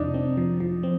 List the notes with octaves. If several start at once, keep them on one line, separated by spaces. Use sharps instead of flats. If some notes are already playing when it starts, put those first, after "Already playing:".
Already playing: F2 C3 F3 C4 D4 D#4
C4
F3
F3
C4